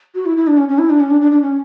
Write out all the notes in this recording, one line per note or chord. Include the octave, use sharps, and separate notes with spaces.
F#4
E4
E4
D4
C#4
C#4
E4
D4
C#4
D4
D4
D4
C#4